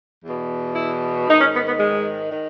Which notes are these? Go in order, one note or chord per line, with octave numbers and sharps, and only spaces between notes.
E2 B2
E4
G#2 D#3 D#4
C#4
B3
B3
G#3
D#3